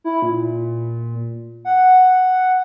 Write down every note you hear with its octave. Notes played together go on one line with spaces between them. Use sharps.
E4
A#2
F#5